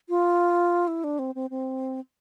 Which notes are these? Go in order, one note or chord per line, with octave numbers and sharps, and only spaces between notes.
F4
E4
D4
C4
C4
C4